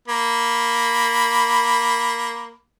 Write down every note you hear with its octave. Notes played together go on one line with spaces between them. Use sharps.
A#3 B5